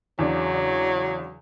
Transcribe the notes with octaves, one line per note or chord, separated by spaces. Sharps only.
E2 C#3 F#3 D4